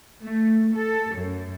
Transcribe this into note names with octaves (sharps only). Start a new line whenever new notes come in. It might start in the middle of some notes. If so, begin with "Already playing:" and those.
A3
A4
F#2